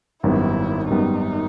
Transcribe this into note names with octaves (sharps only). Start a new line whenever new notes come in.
G#1 F#2 D#3 G3 B3 E4
G#1 F#2 D#3 G3 B3 D#4